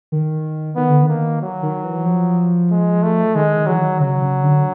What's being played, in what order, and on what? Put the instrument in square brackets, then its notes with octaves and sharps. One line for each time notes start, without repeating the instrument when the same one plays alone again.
[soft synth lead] D#3
[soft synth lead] D#3 [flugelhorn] B3
[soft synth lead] D3
D#3
[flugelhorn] A#3
F#3
[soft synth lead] D#3
E3
F3
[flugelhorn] G#3
A3
[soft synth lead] D#3 [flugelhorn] G#3
[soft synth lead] D#3
[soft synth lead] E3 [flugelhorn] F#3
[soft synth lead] D#3
[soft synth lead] C#3 [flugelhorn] F#3
[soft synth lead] C#3
D3